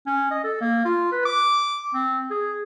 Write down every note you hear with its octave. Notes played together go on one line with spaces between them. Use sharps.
C#4
D#5
A4
A#3
F4
B4
D6
C4
G#4